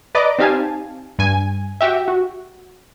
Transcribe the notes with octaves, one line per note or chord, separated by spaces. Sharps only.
B4 D5 D#5 A#5 D6
C4 D#4 G4 F5 G#5 A5
G2 G#5
F#4 G4 E5
F#4